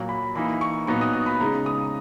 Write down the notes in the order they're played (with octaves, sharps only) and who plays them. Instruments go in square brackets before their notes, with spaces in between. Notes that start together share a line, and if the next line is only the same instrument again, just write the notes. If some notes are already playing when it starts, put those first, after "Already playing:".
Already playing: [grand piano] A#2 F#3 A#3
B5
E3 A#3 D#4 B5
C#6
A#2 F#3 B3 D#4 C#6
D#6
D#6
B5
C#3 G#3 D#4 A#5
D#6